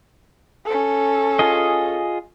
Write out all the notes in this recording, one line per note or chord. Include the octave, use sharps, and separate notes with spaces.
C#4 A4
F4 G#4 D#5